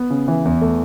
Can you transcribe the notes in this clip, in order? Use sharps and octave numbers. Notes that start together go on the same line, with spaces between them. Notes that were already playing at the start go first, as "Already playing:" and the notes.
Already playing: B3
C#3
E3
E2
A3